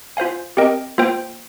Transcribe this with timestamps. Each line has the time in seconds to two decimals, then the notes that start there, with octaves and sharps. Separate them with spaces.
0.17 F4 C5 F5 G#5
0.57 C4 G4 A#4 D#5 G5
0.98 A#3 F4 C5 G5